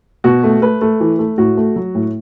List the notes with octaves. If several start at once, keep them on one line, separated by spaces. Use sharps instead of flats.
B2 F#4
A3
A3 B4
A3
E3
A3
A2 F#4
A3
F#3
A2